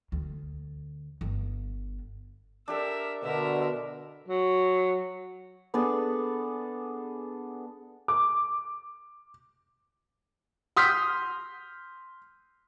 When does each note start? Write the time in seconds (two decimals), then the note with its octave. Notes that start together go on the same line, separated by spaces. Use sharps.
0.12 D2
1.21 G1
2.68 D4 G4 A4 A#4 E5
3.23 B2 D3 A#4 E5
4.27 F#3
5.74 B3 D4 G#4 A4
8.08 D6
10.77 C6 D#6 F6 G6 B6